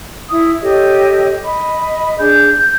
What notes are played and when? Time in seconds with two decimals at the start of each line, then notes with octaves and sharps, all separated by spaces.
0.29 E4 D#6
0.62 G4 A4 C#5 D#5
1.44 D#5 B5
2.19 D4 G#4 G6
2.58 G6